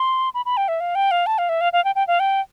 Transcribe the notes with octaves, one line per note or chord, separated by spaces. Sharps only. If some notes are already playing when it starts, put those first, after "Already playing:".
Already playing: C6
B5
B5
G5
E5
F5
G5
F5
A5
F5
E5
F5
F5
G5
G5
F5
G5